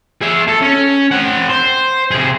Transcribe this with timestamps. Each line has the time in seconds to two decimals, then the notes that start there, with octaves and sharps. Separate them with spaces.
0.22 G#4 E5
0.48 A4
0.62 C#4
1.11 C4 F#5
1.49 C5
2.11 C3 G#4